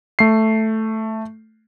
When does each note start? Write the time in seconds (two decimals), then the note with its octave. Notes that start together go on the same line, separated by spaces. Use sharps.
0.19 A3 C7